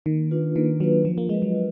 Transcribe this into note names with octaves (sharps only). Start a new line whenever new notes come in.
D#3 A#3
D4 F4 B4
D#3 A#3
F#3 D4 F4 B4
F3 F4
A#3
G#3 B4 D#5
F#3
F4